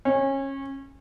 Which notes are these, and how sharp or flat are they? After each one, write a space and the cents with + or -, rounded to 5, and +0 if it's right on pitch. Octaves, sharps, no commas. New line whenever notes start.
C#4 -25